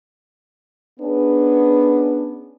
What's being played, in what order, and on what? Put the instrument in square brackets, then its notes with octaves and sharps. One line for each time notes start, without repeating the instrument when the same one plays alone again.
[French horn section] B3 C#4 D4 G#4 B4